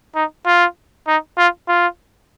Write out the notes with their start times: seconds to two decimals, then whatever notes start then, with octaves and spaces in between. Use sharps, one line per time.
0.15 D#4
0.46 F4
1.07 D#4
1.38 F4
1.68 F4